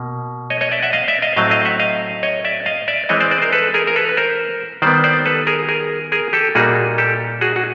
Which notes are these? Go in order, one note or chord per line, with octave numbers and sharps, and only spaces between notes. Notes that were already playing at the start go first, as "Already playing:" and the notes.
Already playing: B2 A#3
C#5 D#5
C#5 D#5
D5 E5
E5 F#5
D#5 F5
D5 E5
D#5 F5
A2 F#3 A3 C4 D#5 F5
D#5 F5
E5 F#5
D#5 F5
C#5 D#5
D5 E5
D#5 F5
D5 E5
E3 G#3 C4 E4 C#5 D#5
C5 D5
C5 D5
A#4 C5
A4 B4
G#4 A#4
A#4
A4 B4
B4
A#4 C5
D#3 G3 B3 C5 D5
C5 D5
A4 B4
G#4 A#4
G#4 A#4
G#4 A#4
G4 A4
A#2 G3 A#3 D#4 F#4 G#4
G4 A4
F#4 G#4
F#4